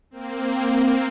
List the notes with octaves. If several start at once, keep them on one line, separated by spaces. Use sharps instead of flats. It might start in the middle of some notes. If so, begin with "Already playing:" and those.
A#3 C4